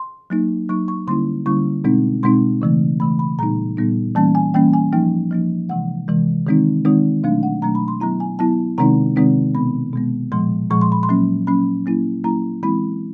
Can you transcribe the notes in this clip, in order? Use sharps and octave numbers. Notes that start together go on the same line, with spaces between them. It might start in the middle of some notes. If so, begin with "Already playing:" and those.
Already playing: C6
F#3 A#3 D#4
F#3 A#3 D#4 C#6
C#6
D3 G3 A#3 C#4 E4 C6
D3 G3 A#3 C#4 E4 C#6
B2 G#3 C4 D#4
B2 G#3 C4 D#4 C6
C#3 E3 A3
C#3 E3 A3 B5
B5
A#2 G3 B3 D#4 A#5
A#2 G3 B3 D#4
E3 G3 A#3 C#4 A5
G#5
E3 G3 A#3 C#4 G5
G#5
F3 A#3 D#4 G5
F3 A#3 D#4
C3 E3 G#3 F#5
C3 E3 G#3
D#3 G#3 C4 D#4
D#3 G#3 C4 D#4
B2 F#3 A3 D4 F5
F#5
B2 F#3 A3 D4 A#5
B5
C6
F#3 B3 E4 A#5
G#5
F#3 B3 E4 A5
C3 D#3 G#3 C4 D#4 A#5
C3 D#3 G#3 C4 D#4
B2 G#3 B3 B5
B2 G#3 B3
A#2 F3 G#3 C6
A#2 F3 G#3 C#6
C6
B5
C6
F#3 A#3 C#4
F#3 A#3 C#4 B5
F#3 A#3 C#4 E4
F#3 A#3 C#4 E4 A#5
E3 G#3 C4 E4 B5